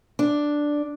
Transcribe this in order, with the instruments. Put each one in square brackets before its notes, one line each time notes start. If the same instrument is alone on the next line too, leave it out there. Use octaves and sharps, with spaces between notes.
[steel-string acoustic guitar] D4